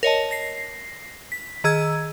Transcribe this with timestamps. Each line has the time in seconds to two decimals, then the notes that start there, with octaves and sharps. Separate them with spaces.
0.03 A#4 C#5 D#5 A5
0.31 A#6 C7
1.32 B6
1.64 D#3 G#4 E6 G#6